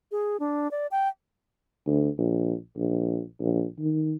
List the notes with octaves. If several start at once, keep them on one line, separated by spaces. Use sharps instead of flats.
G#4
D4
D5
G5
D2
A#1
A#1
A#1
D#3